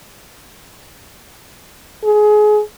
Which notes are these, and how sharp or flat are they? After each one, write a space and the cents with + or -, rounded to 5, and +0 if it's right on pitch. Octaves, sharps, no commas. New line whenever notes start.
G#4 +25